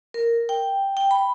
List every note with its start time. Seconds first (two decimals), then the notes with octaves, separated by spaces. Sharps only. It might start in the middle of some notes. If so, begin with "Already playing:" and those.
0.14 A#4
0.49 G5
0.97 G5
1.11 B5